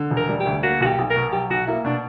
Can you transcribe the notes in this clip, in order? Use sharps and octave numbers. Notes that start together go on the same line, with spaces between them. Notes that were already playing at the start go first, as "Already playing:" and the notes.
Already playing: D3
E1
A#4
G3
G4
D2
A#3 F#4
B1 F#4
G4
B1
A#4
B2
F#3 G4
B1 F#4
A#3 E4
B2 D4